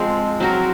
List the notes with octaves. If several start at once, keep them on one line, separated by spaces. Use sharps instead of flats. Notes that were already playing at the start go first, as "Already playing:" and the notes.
Already playing: F3 G#3 C4
F#3 C4 F#4 A#4